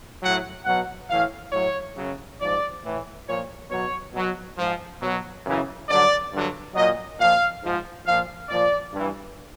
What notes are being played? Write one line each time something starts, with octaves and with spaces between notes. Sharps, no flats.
A2 F#3 F#5
B2 F#3 F#5
A2 E3 F5
A2 F#3 C#5
F#2 C#3 F#3
G#2 F3 D5
A2 E3
A#2 F3 C#5
B2 F#3 C#5
B2 F#3
G#2 F3
B2 F#3
F#2 C#3 E3
G2 D3 F#3 D5
G2 D3 F#3
A#2 F#3 D#5
A#2 F3 F5
G#2 F3
A#2 F3 F5
A#2 F3 D5
G2 E3